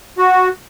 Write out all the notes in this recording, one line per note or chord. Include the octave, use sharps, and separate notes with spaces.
F#4